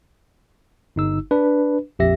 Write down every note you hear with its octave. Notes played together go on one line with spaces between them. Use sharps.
G1 D#4 E6
D4 B4
A#1 F2 G4 E5 A#6